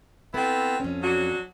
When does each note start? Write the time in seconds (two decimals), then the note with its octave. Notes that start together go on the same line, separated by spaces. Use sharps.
0.34 B3 C4 E4 A4
0.80 F2 C#4
1.02 F#3 D4 F#4